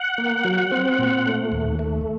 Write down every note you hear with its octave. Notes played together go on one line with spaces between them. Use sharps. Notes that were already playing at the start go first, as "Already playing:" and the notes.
Already playing: F#5
A#3
F#3
C4
A#2
A3
D#2
A3